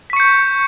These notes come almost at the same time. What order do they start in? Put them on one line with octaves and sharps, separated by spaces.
B6 C#6 C#7 G6